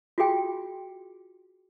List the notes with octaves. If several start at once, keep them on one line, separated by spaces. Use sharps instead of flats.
F4 F#4 G#4 G5